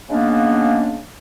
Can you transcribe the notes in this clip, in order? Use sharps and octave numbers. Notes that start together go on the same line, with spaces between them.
C#3 G#3 A#3 B3 C#4 D4